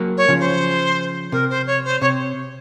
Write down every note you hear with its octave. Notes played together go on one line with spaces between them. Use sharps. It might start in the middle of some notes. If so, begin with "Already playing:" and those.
Already playing: F#3 A#3
C#5
C#3 F3
C5
C3 A#4
C5
C#5
C5
C3 C#5